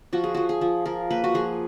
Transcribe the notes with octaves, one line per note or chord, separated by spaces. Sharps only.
F3 F#4
G#4
F3 F#4
G#4
F3
F3 A#4
A#3 B4
F#4
F3 G#4